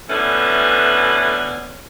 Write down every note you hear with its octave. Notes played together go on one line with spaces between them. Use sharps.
B2 D3 E3 A3 C#4